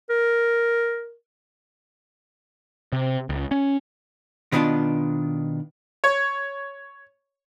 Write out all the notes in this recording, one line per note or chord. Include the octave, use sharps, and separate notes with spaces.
A#4
C3
C#2
C#4
B2 D#3 B3 D4 F4 A5
C#5